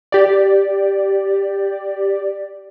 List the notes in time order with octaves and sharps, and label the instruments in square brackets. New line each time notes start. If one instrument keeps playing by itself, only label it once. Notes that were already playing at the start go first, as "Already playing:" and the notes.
[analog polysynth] G4 D5